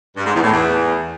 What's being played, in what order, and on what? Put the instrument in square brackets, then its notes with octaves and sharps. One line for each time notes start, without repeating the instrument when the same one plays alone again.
[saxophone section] G2
G#2
E2
A2
E2